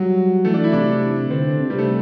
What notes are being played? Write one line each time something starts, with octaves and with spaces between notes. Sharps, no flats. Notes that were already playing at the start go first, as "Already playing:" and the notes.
Already playing: F#3 G3
E3 A3
D4
E4
C3 D4
D3 C4
C3
G3
A3